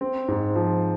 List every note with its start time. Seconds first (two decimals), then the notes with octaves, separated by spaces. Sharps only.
0.01 C4
0.28 G#2
0.56 F3